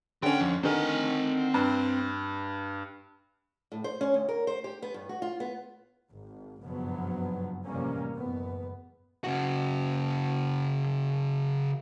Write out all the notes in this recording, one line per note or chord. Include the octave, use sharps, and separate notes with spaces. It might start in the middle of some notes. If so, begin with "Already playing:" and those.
B1 D3 C#4 G5
F2
D3 D#3 C4 G#5
G2
A2
C5
C#4
D2
A#4
C5
G4
B3
G2
F#4
F4
B3
G#1
F#1 G2 B2 F3 F#3 B3
A1 F2 C3 G3 A#3 C#4
F#1 B3
C#3 F#4